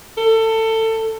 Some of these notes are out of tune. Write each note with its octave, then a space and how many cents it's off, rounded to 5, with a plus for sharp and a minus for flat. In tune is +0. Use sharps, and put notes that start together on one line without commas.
A4 +25